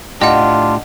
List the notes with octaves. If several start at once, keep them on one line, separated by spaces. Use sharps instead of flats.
A2 D4 F4 G4 D#5 F#5